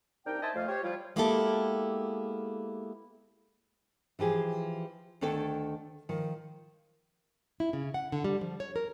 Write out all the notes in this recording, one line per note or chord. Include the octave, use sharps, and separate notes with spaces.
C2 D4 D#4 A#4 G5
D#4 C5 D#5 E5 G#5 A5
F2 A3 F5
G4 C5 C#5
F3 G3 E4 F4
G#3 A#3 B3 E4 G4 A4
E3 F3 G4 G#4
D2 D#3 D4 A4 C#5 G5
D#3 F3
E4
C#3
F#5
D3
G3
F3
C#5
A#4